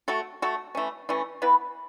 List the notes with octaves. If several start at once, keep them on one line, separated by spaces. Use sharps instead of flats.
A3 F#4 A4
A3 F#4 A4
E3 A3 C#4
E3 A3 C#4
E3 B3 E4 B4